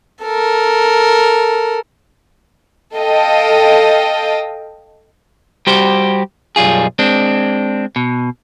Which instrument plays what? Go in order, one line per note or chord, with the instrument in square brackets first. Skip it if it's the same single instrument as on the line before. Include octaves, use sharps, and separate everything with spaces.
[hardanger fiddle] A4 A#4
[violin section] A4 D#5 F5 G5
[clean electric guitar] G3 F#4 G4 C5
B1 F#2 G3 F4 G#4
G#3 C4 D4
B2